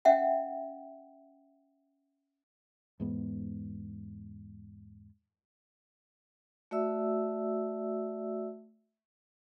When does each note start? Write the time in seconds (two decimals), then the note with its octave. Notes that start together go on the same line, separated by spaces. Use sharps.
0.05 C#4 E5 F#5 G5
3.00 E2 G#2 B3
6.71 A3 F#4 D5 E5 E6